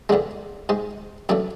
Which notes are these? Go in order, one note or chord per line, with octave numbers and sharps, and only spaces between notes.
E2 D3 G#3 D4
G#2 G#3
F#2 E3 A3 D4